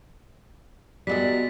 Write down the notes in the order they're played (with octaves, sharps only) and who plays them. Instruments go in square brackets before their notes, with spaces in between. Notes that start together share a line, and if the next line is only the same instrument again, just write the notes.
[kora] G3 G#3 E5 [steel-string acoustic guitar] B3 F#4 A#4 [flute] D5 [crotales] B6